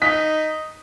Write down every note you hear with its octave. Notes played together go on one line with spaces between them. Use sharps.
D#4 D#6 B6